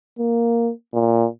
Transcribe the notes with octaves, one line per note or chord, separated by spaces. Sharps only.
A#3
A#2